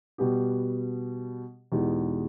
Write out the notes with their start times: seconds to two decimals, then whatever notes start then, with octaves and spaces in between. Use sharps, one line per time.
0.18 B2 G3 B3 G4
1.72 E2 B2 G#3 D#4 G4